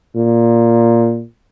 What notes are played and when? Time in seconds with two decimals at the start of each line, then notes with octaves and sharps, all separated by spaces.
0.17 A#2